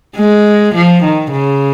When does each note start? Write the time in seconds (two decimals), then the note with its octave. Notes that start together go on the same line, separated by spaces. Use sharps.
0.16 G#3
0.75 F3
1.03 D#3
1.32 C#3